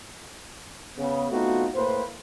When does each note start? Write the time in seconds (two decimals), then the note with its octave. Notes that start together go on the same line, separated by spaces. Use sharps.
0.98 C#3 B3
1.31 A3 B3 C4 D#4 F4 F#4
1.75 A2 A#3 B4 C5